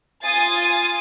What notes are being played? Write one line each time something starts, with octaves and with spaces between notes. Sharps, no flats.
F4 G#5 D#6 A6 C7